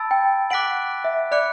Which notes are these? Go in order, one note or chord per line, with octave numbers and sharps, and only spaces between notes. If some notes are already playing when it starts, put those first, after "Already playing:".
Already playing: A5 B5 E6 A6 D7
G5
F#5 D6 F#6 B6 D7 F#7
E5
D5 B5 D6 F#6 C#7